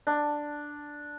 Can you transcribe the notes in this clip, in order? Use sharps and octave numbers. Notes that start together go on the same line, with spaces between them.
D4